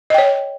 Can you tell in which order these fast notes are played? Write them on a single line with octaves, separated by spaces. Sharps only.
D#5 G5 C#5